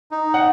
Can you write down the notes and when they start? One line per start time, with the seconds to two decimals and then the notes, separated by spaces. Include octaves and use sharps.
0.11 D#4
0.34 F#5